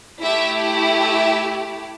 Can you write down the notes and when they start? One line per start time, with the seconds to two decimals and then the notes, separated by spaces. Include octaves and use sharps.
0.21 A3 E4 G4 E5
1.02 E5